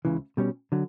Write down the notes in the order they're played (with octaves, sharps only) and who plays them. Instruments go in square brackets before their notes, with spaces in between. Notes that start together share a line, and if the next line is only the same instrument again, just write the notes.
[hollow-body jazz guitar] C#2 C#3 E3
B2 G3 C#4
D3 F#3